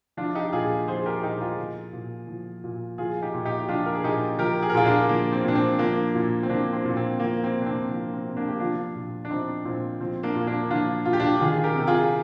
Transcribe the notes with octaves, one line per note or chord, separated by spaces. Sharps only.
F3 D4 F4
D#4 G4
A#2 F4 G#4
F3 G#4 C5
G4 A#4
A#2 D#4 G4
F4 G#4
F3
A#2
F3
A#2
F3 F4 G#4
D#4 G4
A#2
D#4 G4
G4
F3 D4 F4
A#4
G#4
A#2 D#4 G4
F3 G4 A#4
G#4
A#4
A#2 F4 G#4
A#3 D4
F3 A#3
C4
A#2 D4
C4
F3 A#3 D4
A#2
C4
F3 A#3 D4
C4
A#2
C4
F3 A#3
C4
C3
D4
C4
F3 A#3
C4
C3
A#3 D4
G4
F3 D4 F4
A#2
D4
F3 C4 D#4
A#2 C4
F3 C4
A#3 D4
A#2
A#3 D4
F3 D4 F4
A#2 F4
G4
D4 F4
D#3 F4 G#4
G4 A#4
C3
F4 G#4